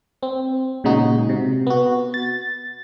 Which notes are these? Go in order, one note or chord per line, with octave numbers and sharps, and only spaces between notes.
C4
A#2 C#3 G#3 D#4 F#4
C3
B3 F#4
A6